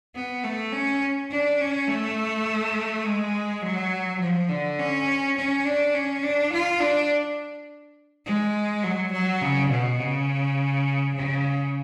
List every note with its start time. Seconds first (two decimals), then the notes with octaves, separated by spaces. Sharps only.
0.15 B3
0.44 A3
0.73 C#4
1.31 D4
1.60 C#4
1.88 A3
3.05 G#3
3.62 F#3
4.20 F3
4.49 D3
4.79 C#4
5.37 C#4
5.65 D4
5.94 C#4
6.23 D4
6.52 F4
6.80 D4
8.26 G#3
8.84 F#3
9.12 F#3
9.42 C#3
9.70 B2
10.00 C#3
11.15 C#3